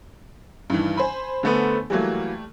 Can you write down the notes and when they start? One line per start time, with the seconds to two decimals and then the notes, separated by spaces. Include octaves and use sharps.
0.70 G2 D#3 E3
0.97 C5 G#5 B5
1.43 D3 A3 B3
1.90 E3 F#3 G3 A3 A#3